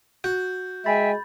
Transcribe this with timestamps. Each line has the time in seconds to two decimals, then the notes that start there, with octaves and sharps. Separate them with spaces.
0.24 F#4 G6
0.86 G#3 E5 G5 G#5 B5 A6